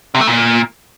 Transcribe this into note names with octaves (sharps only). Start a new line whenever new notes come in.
C3
A3
A#2